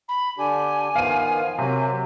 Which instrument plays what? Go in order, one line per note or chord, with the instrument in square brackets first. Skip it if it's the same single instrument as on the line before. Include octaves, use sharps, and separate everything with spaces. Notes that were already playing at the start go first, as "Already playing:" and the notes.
[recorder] B5
[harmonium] D3 D4 G4 [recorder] G#5
[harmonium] D#3 F3 B3 [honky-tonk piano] F5 D#7
[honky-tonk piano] C3 [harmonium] F#3 A#3